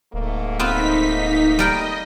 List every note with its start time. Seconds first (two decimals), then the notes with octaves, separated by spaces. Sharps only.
0.14 D1 G#2 A3 A#3
0.60 B3 C4 D#4 F4 B6
1.59 G3 A#4 D#5 G5